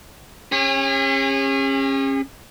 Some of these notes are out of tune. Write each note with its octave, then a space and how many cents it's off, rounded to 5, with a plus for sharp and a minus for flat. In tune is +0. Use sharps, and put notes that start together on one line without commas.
C#4 -25 G#4 -45